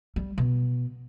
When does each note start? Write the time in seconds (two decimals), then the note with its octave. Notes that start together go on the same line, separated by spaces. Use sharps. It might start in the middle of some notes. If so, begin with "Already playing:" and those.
0.16 G3
0.38 B2